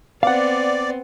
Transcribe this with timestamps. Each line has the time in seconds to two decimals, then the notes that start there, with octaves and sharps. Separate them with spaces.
0.23 B3 C4 D5 F5 F#5